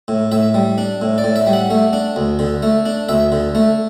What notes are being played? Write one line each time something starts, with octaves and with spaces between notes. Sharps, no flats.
A2
A2 E5
G3
D4
A2
D5
A2
E5
G3
F#5
A3
D4
D2
D3
A3
D4
D2 E5
D3
A3